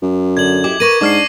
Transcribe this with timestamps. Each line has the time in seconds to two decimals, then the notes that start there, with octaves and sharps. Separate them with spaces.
0.02 F#2
0.37 D3 G#6 F#7
0.64 E4 G4 D#5 D6
0.80 A#4 B4 C#6 A#6 D#7
1.01 G#2 D4 D6 F6 C7